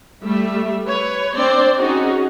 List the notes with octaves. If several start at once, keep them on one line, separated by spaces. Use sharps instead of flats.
G3 A3 E5
B4 C#5
C4 D4 C5 D5
C#4 D#4 F#4 G#4